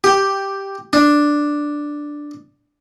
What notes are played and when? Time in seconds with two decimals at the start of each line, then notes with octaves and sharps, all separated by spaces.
0.04 G4
0.93 D4